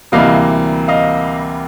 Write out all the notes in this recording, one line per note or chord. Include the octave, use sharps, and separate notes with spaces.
D2 C3 E3 G3 A#3 D#5 F5
D#5 F5